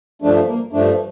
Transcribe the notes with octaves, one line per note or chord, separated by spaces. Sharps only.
G2 F3 A3 D4
A#3
G2 F3 A3 D4